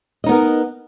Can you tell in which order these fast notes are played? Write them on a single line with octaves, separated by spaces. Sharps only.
D#5 D#4 B3 A#4